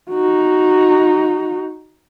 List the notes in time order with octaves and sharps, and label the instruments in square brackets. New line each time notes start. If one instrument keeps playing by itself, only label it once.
[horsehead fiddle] D#4 F#4